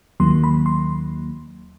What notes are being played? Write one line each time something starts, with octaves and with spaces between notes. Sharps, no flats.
D#2 D#3 F#3 A#3 C6
B5
C6